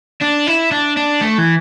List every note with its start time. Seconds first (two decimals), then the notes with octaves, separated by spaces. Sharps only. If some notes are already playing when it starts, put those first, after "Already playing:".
0.21 D4
0.47 E4
0.71 D4
0.97 D4
1.21 A3
1.38 E3